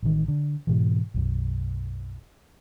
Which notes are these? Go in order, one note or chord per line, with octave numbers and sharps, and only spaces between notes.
A1 D#3
D3
G#2 B2 E3
B1 F#2